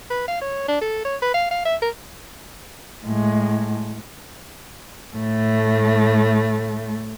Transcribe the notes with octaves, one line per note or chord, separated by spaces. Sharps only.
B4
F5
C#5
D4
A4
C#5
B4
F5
F5
E5
A#4
A2 G#3
A2 A3